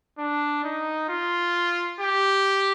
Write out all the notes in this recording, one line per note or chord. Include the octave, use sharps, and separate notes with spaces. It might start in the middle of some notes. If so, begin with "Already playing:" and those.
D4
D#4
F4
G4